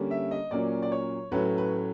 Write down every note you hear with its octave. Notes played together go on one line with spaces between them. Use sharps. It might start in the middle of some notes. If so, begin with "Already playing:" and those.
Already playing: D3 G3 A#3 C#4
E5
D#5
A#2 F#3 A#3 C#4 D5
D5
C#5
A2 F#3 A3 C#4 B4
B4